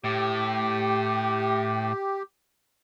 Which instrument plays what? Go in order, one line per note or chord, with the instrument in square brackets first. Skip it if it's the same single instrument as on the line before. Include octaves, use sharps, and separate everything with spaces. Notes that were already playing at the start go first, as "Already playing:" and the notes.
[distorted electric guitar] A2 [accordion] G4